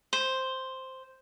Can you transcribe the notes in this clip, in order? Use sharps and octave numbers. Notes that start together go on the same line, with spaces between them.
C5